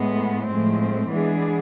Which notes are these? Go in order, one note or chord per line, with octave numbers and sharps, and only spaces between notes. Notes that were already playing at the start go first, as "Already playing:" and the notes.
Already playing: A2 G#3 B3
A2 F3 G#3 C4
E3 G#3 B3 D4 G#4